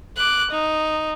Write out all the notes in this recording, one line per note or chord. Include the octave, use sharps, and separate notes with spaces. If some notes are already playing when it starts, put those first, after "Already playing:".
D6 F#6
D#4